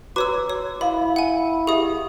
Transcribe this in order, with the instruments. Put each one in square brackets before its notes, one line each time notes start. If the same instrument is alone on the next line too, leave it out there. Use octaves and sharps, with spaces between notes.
[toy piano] F#4 A#5 D6 [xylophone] B4 C#5 E6
[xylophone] C#5
[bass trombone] E4 [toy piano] D#5 F5 [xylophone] B5
[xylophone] F#5 G#5
[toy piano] G4 D#5 E5 [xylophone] G#4 D#6